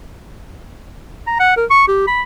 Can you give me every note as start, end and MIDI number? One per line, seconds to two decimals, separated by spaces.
1.27 1.35 82
1.39 1.52 78
1.56 1.65 70
1.70 1.83 85
1.88 2.07 67
2.07 2.22 83